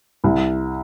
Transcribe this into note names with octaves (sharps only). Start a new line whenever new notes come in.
C2